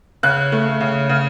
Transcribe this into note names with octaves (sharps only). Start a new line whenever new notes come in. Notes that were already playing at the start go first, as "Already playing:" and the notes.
C#3 F#6
A3
C#3
C#3